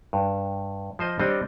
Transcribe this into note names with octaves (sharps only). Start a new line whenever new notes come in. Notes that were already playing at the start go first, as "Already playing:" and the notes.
G2
F3 C5 D#5
G3 C4 D4 C#5 D#5